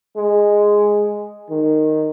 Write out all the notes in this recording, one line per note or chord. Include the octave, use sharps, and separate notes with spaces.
G#3
D#3